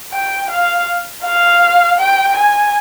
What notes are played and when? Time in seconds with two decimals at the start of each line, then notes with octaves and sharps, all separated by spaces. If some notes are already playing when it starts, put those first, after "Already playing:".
0.12 G5
0.50 F5
1.24 F5
1.99 G5
2.37 G#5